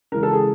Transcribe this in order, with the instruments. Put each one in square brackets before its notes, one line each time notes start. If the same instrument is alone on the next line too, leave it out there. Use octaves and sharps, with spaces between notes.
[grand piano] C#3 E3 G#3 [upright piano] A#4
[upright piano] A4
G#4